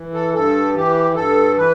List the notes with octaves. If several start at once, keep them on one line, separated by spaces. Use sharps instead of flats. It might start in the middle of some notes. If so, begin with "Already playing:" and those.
Already playing: E3
A4
G2 A4
E3 G4
G2 A4
E3 B4